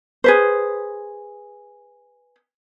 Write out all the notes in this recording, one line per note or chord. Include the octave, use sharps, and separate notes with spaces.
G#4 B4 C5